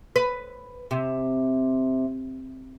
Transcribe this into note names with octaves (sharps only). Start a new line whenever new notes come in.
B4
C3